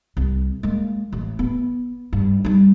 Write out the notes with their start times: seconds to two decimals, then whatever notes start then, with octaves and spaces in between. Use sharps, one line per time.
0.17 C2
0.63 G#3 A#3
1.12 A1
1.39 B3
2.13 G2
2.45 G3 D#4